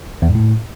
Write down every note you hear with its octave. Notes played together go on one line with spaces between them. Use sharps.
E2
G#2
A2